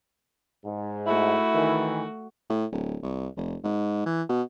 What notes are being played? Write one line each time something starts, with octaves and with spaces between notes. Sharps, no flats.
G#2
A3 E4 F#4
D#3 E3
A2
D1
C2
F1
G#2
E3
B2